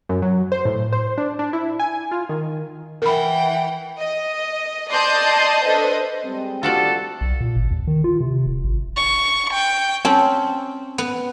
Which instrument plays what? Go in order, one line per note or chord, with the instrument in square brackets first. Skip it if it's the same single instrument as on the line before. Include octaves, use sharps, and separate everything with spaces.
[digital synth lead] F#2
F#3
C5
A2
C5
D4
D4
E4
G#5
F4
D#3
[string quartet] E3 F#5 G5 [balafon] A#4 B5
[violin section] D#5
D5 D#5 A5 C6 D#6 G6
D4 A4 B4 C5 D#5
[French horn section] G3 G#3 C4
[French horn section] D3 G3 [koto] F4 F#4 D5 [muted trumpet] A4
[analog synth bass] B1
A#2
G#1
D#2
D#3
F4
C3
D1
G#1
[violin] C#6
G5
[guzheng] C4 C#4 [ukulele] A5
[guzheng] B3